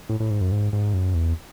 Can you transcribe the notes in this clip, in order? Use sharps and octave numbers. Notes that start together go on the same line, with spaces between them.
A2
A2
G#2
F#2
G#2
G#2
F#2
E2